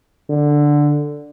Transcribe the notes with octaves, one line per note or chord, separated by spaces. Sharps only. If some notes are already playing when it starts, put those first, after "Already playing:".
D3